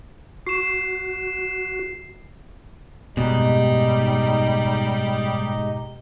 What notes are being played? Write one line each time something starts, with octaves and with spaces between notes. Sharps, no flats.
F#4 C7 E7
F#1 G#2 B2 G3 D#4 G4 D#5